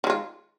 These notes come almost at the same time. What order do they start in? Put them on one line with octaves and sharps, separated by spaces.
D#3 G#3 F4